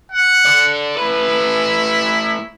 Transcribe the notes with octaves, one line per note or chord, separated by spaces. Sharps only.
F#5
A4 D5
A2 E4 B4